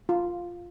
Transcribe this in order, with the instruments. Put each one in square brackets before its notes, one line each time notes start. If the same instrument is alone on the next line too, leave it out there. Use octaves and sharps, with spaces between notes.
[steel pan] F4